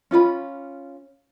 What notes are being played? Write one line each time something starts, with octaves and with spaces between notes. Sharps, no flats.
C#4 F4 D5 B5